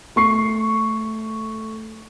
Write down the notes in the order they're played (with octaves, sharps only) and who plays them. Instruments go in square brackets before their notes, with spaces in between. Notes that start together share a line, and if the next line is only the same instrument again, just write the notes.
[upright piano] A3 C#6 C7